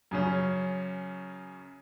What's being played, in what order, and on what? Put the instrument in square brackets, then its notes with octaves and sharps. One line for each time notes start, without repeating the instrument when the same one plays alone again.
[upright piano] F#2 C#3 C#4